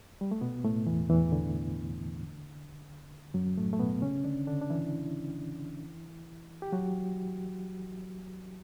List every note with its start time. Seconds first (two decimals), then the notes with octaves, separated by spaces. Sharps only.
0.21 G3
0.31 A3
0.41 B2 B3
0.64 A2 A3
0.86 E2 E3
1.09 E2 E3
1.32 D3
3.34 F#2 F#3
3.57 A2 A3
3.73 A3
3.79 B2 B3
4.02 C#3 C#4
4.24 D3 D4
4.47 D3 D4
4.62 D4
4.70 E3 E4
6.62 G4
6.72 F#3 F#4